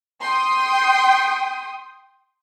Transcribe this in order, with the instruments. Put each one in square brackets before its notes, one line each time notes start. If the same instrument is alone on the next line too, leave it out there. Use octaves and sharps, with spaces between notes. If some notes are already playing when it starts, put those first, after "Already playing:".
[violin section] G5 C6 D#6